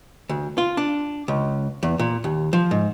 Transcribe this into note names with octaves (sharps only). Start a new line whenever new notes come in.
D2
F4
D4
C#2
E2
A#2
D#2
F3
G#2